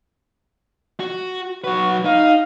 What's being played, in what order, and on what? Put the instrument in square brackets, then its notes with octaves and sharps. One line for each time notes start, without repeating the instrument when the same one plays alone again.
[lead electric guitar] F#4
[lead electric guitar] F#3 B4 [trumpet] F#4
[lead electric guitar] D#4 [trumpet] F5